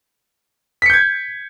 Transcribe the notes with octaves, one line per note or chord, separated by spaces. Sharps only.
G6 G#6 B6 C#7